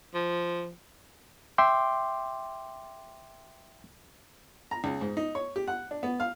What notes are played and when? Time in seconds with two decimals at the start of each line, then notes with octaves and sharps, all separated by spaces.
0.14 F3
1.58 E5 G5 C6 D6
4.71 A#5
4.84 C#2
5.01 G#2
5.17 D#4
5.35 C#5
5.56 G4
5.67 F#5
5.91 D4
6.03 B3
6.20 F5